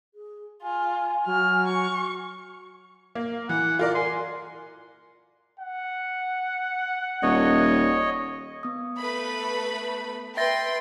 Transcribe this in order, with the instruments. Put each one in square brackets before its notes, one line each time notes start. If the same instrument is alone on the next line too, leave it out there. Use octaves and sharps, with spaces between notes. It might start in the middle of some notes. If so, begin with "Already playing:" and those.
[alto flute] G#4
[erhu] F4 [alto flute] G#5
[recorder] F#3 [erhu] F6
[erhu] C#6
[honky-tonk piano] A#3
[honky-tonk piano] E3 [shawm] F#5
[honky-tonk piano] F4 A#4 D5
[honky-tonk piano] G#5 [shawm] C6
[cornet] F#5
[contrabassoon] D#1 [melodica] C#5 D#5
[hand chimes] B3 D#6
[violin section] A3 B4 B5
[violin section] B4 G5 C6 [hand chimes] E5 A6 A#6